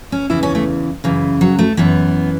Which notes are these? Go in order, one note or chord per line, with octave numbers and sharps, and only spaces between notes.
C#4
E2 C#3 E3 E4
C#4
A3
F#2 C#3 E3
F#3
A3
F#2 E3 B3